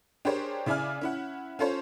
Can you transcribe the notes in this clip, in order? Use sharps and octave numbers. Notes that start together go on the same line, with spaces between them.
D4 G4 G#4 A#4 C5 C#5
C#3 E4 D5 E5 G#5 F6
C#4 E4 F#5
C#4 F4 A4 C5 C#5